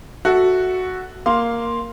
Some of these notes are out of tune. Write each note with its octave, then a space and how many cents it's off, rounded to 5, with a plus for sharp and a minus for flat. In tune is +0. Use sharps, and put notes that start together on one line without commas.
F#4 +0 A4 +0 E5 -10
A#3 +0 F5 +0 C6 +0